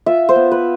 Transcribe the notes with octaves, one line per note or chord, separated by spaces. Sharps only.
F4 E5
C5
B3
B4